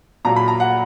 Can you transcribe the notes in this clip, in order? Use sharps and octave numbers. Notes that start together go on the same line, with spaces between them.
A#2 F#3 A#3 A#5
B5
A#5
F#5